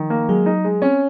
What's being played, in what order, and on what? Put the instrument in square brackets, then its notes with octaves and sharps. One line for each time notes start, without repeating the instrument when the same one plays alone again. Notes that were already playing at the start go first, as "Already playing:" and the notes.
Already playing: [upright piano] D#3 [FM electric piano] F3
[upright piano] A#3
[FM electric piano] F#3 [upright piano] G#3
[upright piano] D#4
G#3
[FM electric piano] C4 [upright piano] C#4